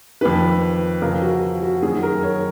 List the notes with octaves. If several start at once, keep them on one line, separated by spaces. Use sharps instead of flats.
F2 D#3 B4
F2 C#3 A#4
F#4
F#4
F#4
F#2 D#3 G#4
A#4
C#5